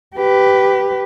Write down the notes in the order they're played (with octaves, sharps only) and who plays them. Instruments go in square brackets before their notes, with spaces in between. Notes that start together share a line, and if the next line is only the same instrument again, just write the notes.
[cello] G4 B4